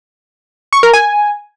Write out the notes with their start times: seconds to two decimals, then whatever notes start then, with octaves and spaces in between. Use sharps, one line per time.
0.73 C#6
0.83 A#4
0.93 G#5